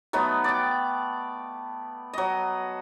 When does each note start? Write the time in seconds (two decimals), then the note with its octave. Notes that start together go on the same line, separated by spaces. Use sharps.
0.13 F#3 A3 B3 D#4
0.44 D5 G5
2.13 F#3 D#5